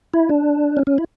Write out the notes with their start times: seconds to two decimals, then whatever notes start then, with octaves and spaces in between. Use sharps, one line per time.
0.14 E4
0.29 D4
0.77 C#4
0.87 C#4
0.98 E4